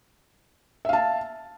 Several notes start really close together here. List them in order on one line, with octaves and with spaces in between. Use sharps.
E5 F5 A5